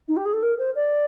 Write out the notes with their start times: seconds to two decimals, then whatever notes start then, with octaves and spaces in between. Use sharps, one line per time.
0.08 D#4
0.16 G4
0.25 G#4
0.33 A4
0.42 A#4
0.58 C5
0.75 D5